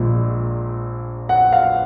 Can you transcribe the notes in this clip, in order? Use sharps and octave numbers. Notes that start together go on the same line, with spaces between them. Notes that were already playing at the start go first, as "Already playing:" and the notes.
Already playing: A#1 A#2 G#3
F#5
F5